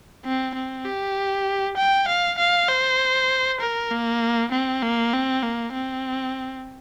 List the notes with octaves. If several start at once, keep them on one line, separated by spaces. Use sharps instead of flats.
C4
C4
G4
G5
F5
F5
C5
A#4
A#3
C4
A#3
C4
A#3
C4